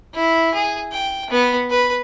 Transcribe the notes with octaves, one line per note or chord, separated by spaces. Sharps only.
E4
G#4
G5
B3
B4